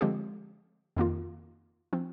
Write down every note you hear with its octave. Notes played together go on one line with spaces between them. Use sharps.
D3 F3 G#3 C4 G4
F2 D#3 A#3 F4
F3 C4